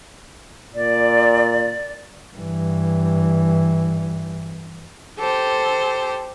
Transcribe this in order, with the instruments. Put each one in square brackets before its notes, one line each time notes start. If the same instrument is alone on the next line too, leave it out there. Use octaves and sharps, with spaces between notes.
[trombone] A#2 [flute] D5
[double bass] G2 E3
[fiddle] G4 C5 [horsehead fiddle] A4